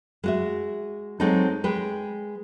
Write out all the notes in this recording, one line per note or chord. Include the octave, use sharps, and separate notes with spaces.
G#3 F#4 E5
F#3 G#3 C4 D#4 G#4 A4
G#3 B4 G5